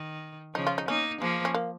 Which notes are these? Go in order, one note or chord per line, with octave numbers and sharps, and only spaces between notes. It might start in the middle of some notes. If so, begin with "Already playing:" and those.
Already playing: D#3
C#3 F3 D#4
F4
D#4
A#3 C#4 D#4
F3 G#3 A#3
C#4
A#3